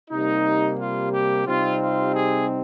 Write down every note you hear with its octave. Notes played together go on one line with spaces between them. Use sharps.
C3 G3 A#3 D#4
F4
G4
C3 G3 C4 D#4 F4
F4
G#4